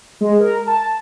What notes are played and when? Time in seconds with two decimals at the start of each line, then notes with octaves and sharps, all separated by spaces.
0.21 G#3
0.40 A#4
0.67 A5